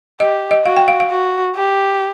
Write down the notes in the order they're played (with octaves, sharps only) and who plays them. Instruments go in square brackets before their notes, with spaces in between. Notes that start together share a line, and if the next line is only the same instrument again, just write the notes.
[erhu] G4 [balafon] D#5
[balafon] D#5
[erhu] F#4 [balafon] F5
[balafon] G5
F5
F5
[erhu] F#4
G4